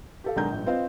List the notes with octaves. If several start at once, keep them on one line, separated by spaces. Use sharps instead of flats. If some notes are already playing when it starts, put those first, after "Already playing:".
G4 A4 F5
B1 D#3 G#3 D4 A#5 G6
A#1 G2
C4 F4 B4 C5 D#5 F5